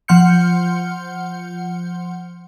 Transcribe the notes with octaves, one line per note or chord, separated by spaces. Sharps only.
F3 F#5 C6 F6 G6 C#7